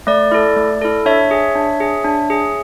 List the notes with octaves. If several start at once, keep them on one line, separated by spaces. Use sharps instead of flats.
A3 D5
E4 A4
A3
E4 A4
D4 C#5 E5
G#4
D4
G#4
D4
G#4